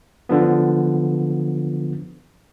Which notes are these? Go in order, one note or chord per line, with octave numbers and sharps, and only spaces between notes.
D3 F3 B3